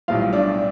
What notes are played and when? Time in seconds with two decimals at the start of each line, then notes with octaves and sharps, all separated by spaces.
0.08 B1 A2 G3 F4 F5
0.33 D4 D5